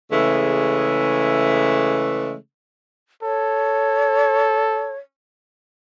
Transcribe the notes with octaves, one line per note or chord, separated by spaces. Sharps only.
C#3 E3 G#3 A3
A4 C#5